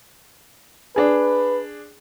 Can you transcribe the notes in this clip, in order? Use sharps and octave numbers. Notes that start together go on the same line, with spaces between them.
D4 G#4 B4